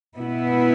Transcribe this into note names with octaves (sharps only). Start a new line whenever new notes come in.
B2 B3 E4